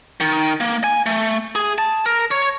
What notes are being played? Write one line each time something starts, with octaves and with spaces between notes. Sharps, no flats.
D#3
A#3
G#5
A3
G#4
A5
A#4
C#5